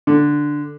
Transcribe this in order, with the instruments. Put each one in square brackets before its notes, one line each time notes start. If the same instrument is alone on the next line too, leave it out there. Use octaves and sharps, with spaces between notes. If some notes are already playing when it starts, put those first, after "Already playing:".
[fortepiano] D3